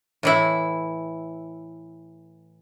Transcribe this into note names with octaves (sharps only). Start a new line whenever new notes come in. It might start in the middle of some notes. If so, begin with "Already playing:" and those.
A2 E3 E4